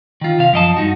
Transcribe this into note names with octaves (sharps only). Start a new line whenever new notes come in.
D#3 F4
C3 F5
F#2 F3 D#5 A5
G2 D#4 F#4